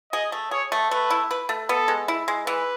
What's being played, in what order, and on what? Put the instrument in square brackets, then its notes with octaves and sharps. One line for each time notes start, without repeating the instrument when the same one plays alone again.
[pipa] G#4 [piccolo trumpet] D#5
[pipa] A3
[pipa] G#4 [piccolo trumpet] C#5
[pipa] A3
[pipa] A3 [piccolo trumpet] B4
[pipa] E4
B4
A3
[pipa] B3 [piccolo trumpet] A4
[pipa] G#3
E4
G#3
[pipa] E3 [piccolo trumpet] B4